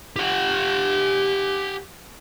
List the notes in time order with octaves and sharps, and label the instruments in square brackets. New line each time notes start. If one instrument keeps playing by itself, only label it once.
[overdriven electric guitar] G4 F#5